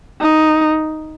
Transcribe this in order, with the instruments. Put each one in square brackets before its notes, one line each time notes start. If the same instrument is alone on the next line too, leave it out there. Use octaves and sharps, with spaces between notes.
[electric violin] D#4